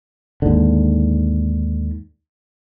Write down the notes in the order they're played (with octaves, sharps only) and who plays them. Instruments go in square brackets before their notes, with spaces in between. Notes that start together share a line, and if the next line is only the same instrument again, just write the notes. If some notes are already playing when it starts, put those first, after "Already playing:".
[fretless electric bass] D#2 G#2 D3